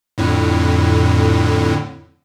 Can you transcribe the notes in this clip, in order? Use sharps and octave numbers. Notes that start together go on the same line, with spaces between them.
F2 A2 D3